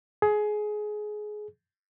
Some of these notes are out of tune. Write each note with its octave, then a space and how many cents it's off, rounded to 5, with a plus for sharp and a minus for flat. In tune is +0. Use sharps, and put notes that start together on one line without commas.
G#4 +20